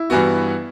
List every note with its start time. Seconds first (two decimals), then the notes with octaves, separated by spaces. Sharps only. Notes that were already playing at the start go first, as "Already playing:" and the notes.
Already playing: E4
0.10 G2 E3 B3 F#4